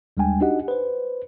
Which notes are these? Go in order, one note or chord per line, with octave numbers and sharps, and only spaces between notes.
D#2 G3 G#3 D4 G5 G#5
D4 D#4 F#4 G4 D#5 F#5
B4 C5